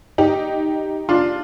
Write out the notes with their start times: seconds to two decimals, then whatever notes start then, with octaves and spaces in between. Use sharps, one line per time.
0.18 D#4 G4
1.09 D4 F4